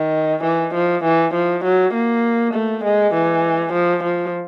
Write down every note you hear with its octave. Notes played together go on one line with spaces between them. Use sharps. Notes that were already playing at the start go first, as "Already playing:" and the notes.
Already playing: D#3
E3
F3
E3
F3
F#3
A#3
A3
G#3
E3
F3
F3